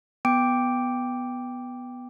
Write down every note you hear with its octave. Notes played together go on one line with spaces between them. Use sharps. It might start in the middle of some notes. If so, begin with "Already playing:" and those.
B3 G5 D6 D7